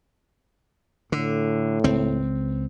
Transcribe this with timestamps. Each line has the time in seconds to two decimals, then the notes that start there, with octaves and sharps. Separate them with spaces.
1.12 A2 D3
1.84 C#2 C4